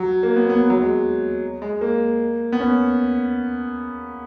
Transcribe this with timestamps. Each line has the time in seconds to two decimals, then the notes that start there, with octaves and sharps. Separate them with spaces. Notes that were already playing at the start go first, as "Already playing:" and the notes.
Already playing: F#3
0.23 A#3
0.36 B3
0.49 B3
0.70 F#3
0.82 G#3
1.62 G#3
1.81 A#3
2.52 B3
2.60 C#4